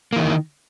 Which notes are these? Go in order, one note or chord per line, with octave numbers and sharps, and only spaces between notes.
D#3 E3 A#3